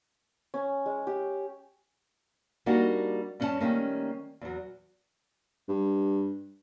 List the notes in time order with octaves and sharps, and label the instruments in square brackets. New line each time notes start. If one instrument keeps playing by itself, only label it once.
[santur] C#4
G#3
G4
[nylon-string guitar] G3 A#3 D4 D#4 F#4
G2 C#4 D4 A4 C#5 A5
D#3 G3 A3 A#3 C#4
E2 F#3
[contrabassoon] G2